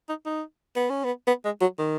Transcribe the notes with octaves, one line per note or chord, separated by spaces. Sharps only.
D#4
D#4
B3
C#4
B3
B3
G#3
F#3
D#3